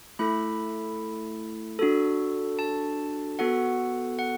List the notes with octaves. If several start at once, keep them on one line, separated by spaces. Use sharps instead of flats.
A3 E4 A4 B5
D4 F#4 A4
A5
B3 F#4 A4 F#5
F#5